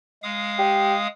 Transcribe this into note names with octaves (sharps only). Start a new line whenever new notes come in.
G#3 F5 D#6
G4